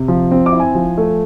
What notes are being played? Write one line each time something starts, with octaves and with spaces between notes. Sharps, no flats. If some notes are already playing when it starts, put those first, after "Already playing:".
Already playing: C3
F3
C4
D6
E4
G#5
F3
A3